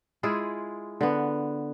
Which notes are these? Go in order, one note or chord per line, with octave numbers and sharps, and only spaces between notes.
G#3 E4 F4 G#4
D3 B3